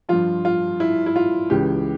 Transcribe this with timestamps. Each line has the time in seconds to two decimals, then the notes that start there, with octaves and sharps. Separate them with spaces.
0.09 G2 F3 F4
0.45 F4
0.80 E4
1.06 E4
1.16 F4
1.50 C#2 C#3 E3 G4